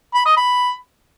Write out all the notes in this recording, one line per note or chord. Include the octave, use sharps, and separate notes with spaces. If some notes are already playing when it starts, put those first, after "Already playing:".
B5
D#5
B5